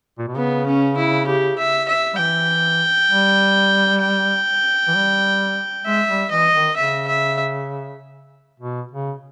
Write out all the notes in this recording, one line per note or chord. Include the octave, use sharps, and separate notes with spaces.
A#2
B2
C#3 B3
C#4
E4
G4
E5
E5
G3
E3 G5
G3
G5
E3
G3
G#3 E5
G3
E3 D#5
D#3
C#3 E5
E5
B2
C#3